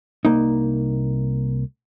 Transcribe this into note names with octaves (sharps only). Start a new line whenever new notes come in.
C2 A#3 D#4